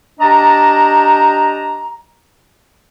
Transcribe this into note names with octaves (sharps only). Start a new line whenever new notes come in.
D4 G4 D#5 A5 A#5